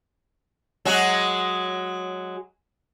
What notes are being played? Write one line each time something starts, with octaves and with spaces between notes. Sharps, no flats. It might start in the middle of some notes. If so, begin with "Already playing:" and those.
F#3 G#3 F#4